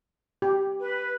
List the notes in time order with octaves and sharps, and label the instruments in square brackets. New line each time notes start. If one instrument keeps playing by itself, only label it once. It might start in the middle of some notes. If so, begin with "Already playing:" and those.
[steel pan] G4
[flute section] B4